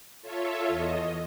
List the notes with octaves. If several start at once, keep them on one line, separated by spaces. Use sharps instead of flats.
F4 A4 C#5 E5
E2 D#5